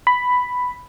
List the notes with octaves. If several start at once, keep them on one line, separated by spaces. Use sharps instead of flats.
B5